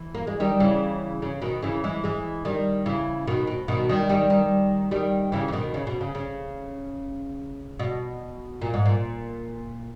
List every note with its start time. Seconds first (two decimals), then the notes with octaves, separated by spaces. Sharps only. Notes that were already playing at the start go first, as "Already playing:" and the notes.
Already playing: E3
0.15 A#3
0.27 G#3
0.40 D#3 G3
0.60 C#3 E3
1.22 C#3
1.42 B2 D#3
1.62 C#3 E3
1.84 E3 G#3
2.04 E3 G#3
2.45 D#3 G3
2.86 C#3 E3
3.27 B2 D#3
3.47 B2
3.68 B2 D#3
3.89 D#3 G3
4.09 D#3 G3
4.30 D#3 G3
4.91 D#3 G3
5.32 C#3 E3
5.48 E3
5.53 B2 D#3
5.74 C#3
5.87 B2
6.01 C#3
6.15 C#3
7.79 B2
8.62 A#2
8.74 G#2
8.85 A#2